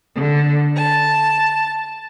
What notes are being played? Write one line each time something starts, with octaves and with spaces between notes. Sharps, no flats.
D3
A5